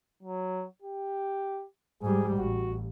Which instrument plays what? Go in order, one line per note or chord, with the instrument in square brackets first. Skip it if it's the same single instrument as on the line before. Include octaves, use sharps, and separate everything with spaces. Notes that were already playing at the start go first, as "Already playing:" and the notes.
[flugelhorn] F#3
G4
[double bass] G#2 G3 [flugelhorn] G#4
[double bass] A1 [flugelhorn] F#4